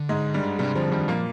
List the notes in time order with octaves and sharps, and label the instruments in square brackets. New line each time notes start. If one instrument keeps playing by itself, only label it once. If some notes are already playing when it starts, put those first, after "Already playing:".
Already playing: [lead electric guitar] D3
[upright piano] G#2 G#3
G2 G3
[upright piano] G2 G3 [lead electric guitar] C3
[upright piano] F2 F3 [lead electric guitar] D3
[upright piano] G2 G3 [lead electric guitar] D#3
[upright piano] A#2 A#3 [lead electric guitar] F3